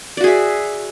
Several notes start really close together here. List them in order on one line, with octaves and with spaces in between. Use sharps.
D5 F#4 G#4 E5